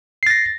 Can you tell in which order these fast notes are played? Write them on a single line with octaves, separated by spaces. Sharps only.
C7 A6 A#6